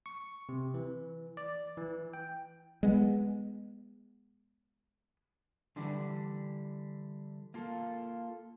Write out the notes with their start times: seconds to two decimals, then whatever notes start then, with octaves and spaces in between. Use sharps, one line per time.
0.06 C#6
0.49 C3
0.74 E3
1.37 D5
1.77 E3
2.13 G5
2.83 G#3 B3
5.76 D3 E3 G3 D4
7.54 A#3 F4 A4